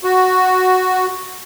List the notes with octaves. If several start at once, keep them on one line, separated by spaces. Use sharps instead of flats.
F#4